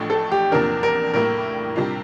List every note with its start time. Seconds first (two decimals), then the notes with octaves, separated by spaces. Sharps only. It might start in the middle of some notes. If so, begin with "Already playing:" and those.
Already playing: A1 A2 F3 A3 D4
0.10 A4
0.32 G4
0.52 E2 C3 F3 A#3 D4 A#4
0.83 A#4
1.13 A2 G3 A#3 E4 A#4
1.76 C3 G3 D4 F4